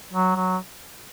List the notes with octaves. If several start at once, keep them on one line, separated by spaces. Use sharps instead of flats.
F#3
F#3